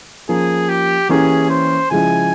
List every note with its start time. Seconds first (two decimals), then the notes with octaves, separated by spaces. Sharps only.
0.29 F3 A#3 C#4 G#4
0.69 G4
1.09 E3 A#3 C#4 G4 G#4 A#4
1.50 C5
1.91 C#3 F3 G#3 E4 G#5